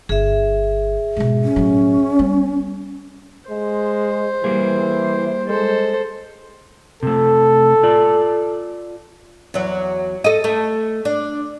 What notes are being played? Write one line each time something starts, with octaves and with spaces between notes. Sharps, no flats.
G1 G#4 E5
G#2 B2
C#4
A2 F#3
G3 B3
G#3 C5
E3 G3 A#3 G#4
G#3 A4 C5
C3 A3 A4
F4 D5
E2 F#3
A4 D#5
A3
D4